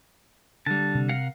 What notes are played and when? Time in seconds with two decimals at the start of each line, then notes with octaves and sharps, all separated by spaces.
0.66 D3 G3 A5
0.95 C3
1.09 A#4 F5 F#5